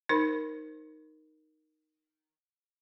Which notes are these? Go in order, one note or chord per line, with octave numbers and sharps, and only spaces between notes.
D#4 A#4 C5 B5